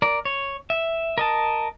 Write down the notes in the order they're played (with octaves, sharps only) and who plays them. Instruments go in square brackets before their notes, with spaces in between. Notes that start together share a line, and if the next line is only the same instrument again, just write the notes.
[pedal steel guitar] A#4 D5
C#5
E5
A#4 D#5 A5